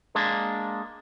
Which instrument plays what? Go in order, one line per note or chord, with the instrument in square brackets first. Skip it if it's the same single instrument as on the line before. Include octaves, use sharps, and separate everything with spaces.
[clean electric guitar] G#3 A#3 D4